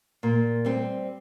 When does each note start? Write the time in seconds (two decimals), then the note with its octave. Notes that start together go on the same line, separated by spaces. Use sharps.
0.23 A#2
0.65 G3 C4